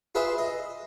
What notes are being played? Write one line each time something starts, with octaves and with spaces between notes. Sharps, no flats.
F4 G#4 B4 C5 E5
D#5